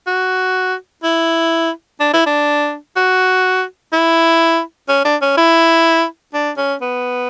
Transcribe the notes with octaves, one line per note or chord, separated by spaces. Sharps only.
F#4
E4
D4
E4
D4
F#4
E4
C#4
D4
C#4
E4
D4
C#4
B3